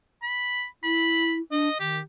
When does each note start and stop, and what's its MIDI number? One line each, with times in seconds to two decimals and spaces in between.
0.23 0.65 83
0.83 1.40 64
0.83 1.34 83
1.51 1.68 62
1.51 1.77 75
1.80 2.00 51
1.80 1.98 67